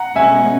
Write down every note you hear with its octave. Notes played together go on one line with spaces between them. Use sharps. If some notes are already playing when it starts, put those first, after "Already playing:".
Already playing: F#5 A#5
B2 G#3 C#4 E5 G#5